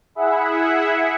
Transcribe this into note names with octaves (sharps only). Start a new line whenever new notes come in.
E4 G#4 E5 F#5